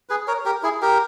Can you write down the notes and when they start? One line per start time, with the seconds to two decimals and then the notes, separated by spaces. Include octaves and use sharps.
0.09 G#4 B4
0.28 A#4 C#5
0.46 G4 A#4
0.63 E4 G#4
0.82 G4 A#4